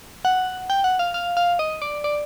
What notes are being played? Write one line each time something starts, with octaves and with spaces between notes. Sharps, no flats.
F#5
G5
F#5
F5
F5
F5
D#5
D5
D5